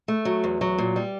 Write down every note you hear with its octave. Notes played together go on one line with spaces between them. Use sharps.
A3
F#3
E2
F#3
A#2
G3